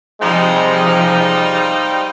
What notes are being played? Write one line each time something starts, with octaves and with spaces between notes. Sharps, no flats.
C3 F3 G3 G#3 D#4 C5 F5 G5